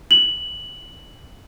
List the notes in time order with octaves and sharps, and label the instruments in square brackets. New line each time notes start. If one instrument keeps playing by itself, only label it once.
[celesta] F#7